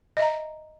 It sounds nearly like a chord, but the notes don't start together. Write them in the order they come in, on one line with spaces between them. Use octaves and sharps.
D#5 E5 A#5